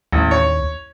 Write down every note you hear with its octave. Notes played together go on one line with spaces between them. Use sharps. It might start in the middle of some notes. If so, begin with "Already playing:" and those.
A1 D#2
C#5